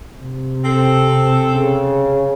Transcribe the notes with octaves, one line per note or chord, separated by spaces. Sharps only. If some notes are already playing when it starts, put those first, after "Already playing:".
C3
C4 A4
C#3